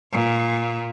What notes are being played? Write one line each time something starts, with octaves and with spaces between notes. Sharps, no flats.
A#2